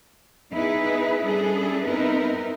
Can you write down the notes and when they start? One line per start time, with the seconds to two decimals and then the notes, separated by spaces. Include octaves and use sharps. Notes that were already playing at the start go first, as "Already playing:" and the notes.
0.55 B3 D#4 E4 G#4 B4
1.23 G3 C#4 D4 E4 G#4 A4
1.85 B3 C4 D#4 E4 A#4 B4